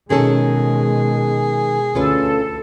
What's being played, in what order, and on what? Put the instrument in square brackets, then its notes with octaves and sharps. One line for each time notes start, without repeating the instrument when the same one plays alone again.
[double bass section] B2 G#3 [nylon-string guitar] D#3 C#4 A4 [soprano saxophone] G#4
[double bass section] D2 [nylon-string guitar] C#4 F4 B4 [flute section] A4